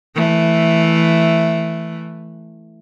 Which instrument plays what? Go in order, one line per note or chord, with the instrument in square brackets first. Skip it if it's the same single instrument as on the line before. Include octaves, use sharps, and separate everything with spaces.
[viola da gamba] E3 A3